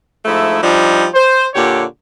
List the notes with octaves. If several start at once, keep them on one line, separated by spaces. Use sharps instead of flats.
G#2 F3 A3 E4
F3 G3 D4 D#4
C5
A#2 D3 G4 C#5